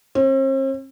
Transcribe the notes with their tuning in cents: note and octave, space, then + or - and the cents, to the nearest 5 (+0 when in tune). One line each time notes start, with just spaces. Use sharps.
C4 +45